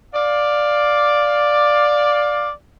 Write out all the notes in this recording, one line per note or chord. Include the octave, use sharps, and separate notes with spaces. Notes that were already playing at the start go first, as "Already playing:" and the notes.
D5 F5